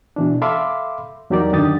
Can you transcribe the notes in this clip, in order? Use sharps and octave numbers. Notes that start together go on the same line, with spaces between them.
B2 E3 D4
A4 E5 F5 B5 C6 D6
E2 F#3 D#4 G4 A#4 D5
F#2 D3 D#3 G4 D#6 A6